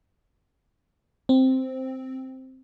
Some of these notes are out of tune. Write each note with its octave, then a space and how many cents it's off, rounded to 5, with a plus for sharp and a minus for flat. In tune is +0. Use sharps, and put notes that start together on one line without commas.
C4 +0